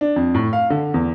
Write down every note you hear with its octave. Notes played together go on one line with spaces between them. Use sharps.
D4
F2
A2
F5
D3
E2